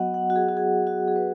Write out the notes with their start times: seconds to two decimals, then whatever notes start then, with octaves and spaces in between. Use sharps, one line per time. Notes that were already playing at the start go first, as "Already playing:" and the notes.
Already playing: F#3 B3 F#4 D#5 F#5
0.14 F#5
0.30 F#4
0.36 G#4
0.49 F#4
0.57 G#4
0.87 F#4
1.08 G#4
1.16 B4